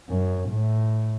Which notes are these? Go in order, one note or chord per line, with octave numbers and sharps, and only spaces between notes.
F#2
A2